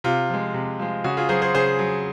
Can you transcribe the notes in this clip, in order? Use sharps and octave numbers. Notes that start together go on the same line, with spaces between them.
C3 F4
F3 G#3
C3
F3 G#3
C#3 F#4
F4 G#4
F#3 G#4 C5
G#4 C5
C#3 G#4 C5
F#3